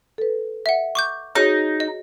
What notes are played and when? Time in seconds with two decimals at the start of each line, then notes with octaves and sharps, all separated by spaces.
0.18 A4 B4
0.66 E5 F#5
0.95 C#6 D6 G6
1.35 D#4 F#4 G#4 C#5
1.80 D#5